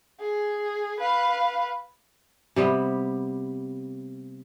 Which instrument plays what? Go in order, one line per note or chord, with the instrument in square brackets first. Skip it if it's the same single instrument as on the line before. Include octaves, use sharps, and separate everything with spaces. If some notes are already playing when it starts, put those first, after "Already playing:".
[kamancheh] G#4
B4 F5
[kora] C3 G3 B3